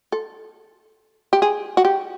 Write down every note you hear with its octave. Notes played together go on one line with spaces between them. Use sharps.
A4
G4
G#4
F#4
G4